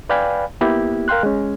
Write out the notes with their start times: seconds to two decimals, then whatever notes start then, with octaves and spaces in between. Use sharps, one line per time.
0.09 B4 D5 F5 G5 G#5 B5
0.61 A#3 B3 E4 G4
1.08 A#4 F5 G5 C6 F#6
1.23 G#3 C#4